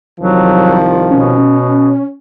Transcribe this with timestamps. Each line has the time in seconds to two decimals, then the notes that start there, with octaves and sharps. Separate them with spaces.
0.20 C2 D#3 F3 F#3
1.11 B2 C#4